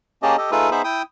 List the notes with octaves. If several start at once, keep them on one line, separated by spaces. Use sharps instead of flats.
A#3 C#4 G4 G#4 D#5 A5
G4 A4 D#5
A3 D#4 F4 G#4 A4 B4
B3 D#4 G#4 C5 E5 B5
E4 G5 D#6